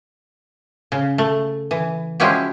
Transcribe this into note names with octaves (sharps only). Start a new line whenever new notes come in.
C#3
A3
E3
F3 G#3 C#4 E4 F#4 G4